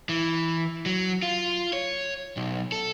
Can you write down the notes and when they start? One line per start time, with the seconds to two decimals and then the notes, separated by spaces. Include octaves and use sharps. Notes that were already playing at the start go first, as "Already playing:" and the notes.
0.09 E3
0.86 F#3
1.22 F4
1.73 C#5
2.37 B1
2.72 A4